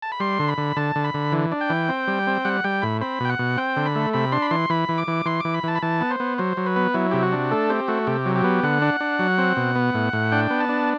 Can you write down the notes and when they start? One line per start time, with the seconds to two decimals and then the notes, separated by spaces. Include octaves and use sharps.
0.02 A5
0.12 B5
0.20 G3 C6
0.39 D3
0.48 B5
0.58 D3
0.76 D3 A5
0.96 D3
1.04 B5
1.14 D3
1.32 E3
1.52 D4
1.61 G5
1.70 E3
1.89 C4
2.08 G3
2.27 C4
2.45 G3 F#5
2.64 G3 G5
2.82 A2 B5
3.01 C4 B5
3.20 B2 G5
3.29 F#5
3.39 B2
3.58 C4 G5
3.76 D3
3.86 B5
3.95 A3
4.13 C3 B5
4.32 D4 C6
4.42 B5
4.51 E3 C6
4.70 E3 B5
4.89 E3
4.98 D6
5.08 E3
5.26 E3 C6
5.40 E3 D6
5.54 B5
5.63 E3 A5
5.75 B5
5.82 E3 A5
6.01 B3
6.11 C5
6.20 B3
6.38 F#3 C5
6.57 F#3
6.66 B4
6.76 B3
6.94 F#3 E4
7.11 C3 G4
7.23 F#4
7.32 D4
7.51 A3 A4
7.70 C4 G4
7.88 A3 F#4
8.07 C3 G4
8.26 F#3
8.36 G4
8.44 B3
8.63 D3 F#5
8.82 D4
9.01 D4
9.19 F#3
9.38 C4
9.57 B2
9.75 B3
9.94 A2
10.13 A2
10.32 D4 G5
10.50 B3
10.60 A5
10.69 D4